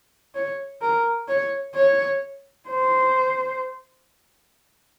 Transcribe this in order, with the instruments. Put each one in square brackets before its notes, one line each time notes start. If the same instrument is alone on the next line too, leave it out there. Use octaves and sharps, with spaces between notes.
[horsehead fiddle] C#5
A#4
C#5
C#5
C5